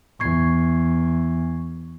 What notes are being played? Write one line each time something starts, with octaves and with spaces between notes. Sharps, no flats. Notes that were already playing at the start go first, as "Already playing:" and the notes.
E2 C#6 G#6 C7